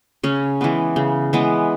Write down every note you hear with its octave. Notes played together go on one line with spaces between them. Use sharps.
C#3 C#4
E3 G#3 B3
C#3
E3 G#3 B3